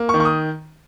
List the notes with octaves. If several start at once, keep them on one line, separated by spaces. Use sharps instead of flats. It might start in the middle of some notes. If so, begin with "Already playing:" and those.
Already playing: A#3
C#6
D#3
C#6
D#6